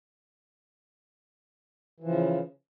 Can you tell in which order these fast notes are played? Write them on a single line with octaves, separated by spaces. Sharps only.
E3 F3 C#3